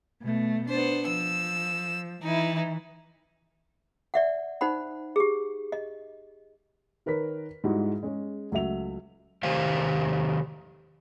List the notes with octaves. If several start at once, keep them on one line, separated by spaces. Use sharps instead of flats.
B2 A3
B3 D4 C5
F3 E6
E3 D#4 E4
D5 E5 F#5
D#4 C5 F#5 B5
G4 G#4
D#5
D#3 A#4 B4 C#5 B6
G#2 G3 G#3 E4 F#4
G#3 C#4 G#4 C#5
C#2 F#3 A3 E5 F7
C3 D#3 G4 C5 F5